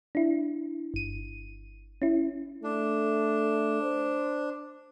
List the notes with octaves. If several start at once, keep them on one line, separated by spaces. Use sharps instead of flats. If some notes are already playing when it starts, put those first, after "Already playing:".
D4 E4
G1 D#7
C#4 E4
A3 D4
C5